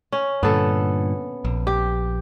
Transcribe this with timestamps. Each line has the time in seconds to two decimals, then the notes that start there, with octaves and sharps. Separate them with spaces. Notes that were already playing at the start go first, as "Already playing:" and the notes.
0.12 C#4
0.43 G2 A#2 D3 B3 A4
1.45 A#1
1.67 G4